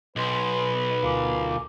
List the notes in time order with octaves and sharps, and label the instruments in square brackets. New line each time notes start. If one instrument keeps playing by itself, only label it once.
[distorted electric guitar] B1 [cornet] B4 [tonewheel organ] D#5 [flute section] G#5 C6
[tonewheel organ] D2 F4 A#4 [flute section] G#5 D6